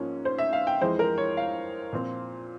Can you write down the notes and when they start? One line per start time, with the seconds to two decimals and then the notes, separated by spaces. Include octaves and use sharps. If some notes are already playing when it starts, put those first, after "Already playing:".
Already playing: G#2 F3 A#3 C#4
0.25 C5
0.38 E5
0.53 F5
0.67 G5
0.81 F2 E3 G#3 C5
0.99 A#4
1.18 C#5
1.37 F5
1.93 A#2 F3 C4